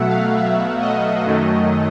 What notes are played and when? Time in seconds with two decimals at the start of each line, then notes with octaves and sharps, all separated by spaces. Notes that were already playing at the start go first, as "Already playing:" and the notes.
Already playing: B2 F#3 A3 E5 F#5
0.08 F5
0.37 E5
0.81 D#5
1.25 F#2 D#3 F#3 A3